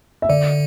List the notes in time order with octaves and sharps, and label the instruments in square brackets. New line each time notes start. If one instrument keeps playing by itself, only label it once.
[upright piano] E5
[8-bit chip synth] D3 [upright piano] D5